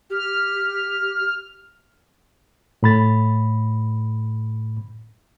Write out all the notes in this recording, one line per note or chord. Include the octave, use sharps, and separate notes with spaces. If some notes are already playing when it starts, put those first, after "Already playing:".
G4 F6
A2 B5 A6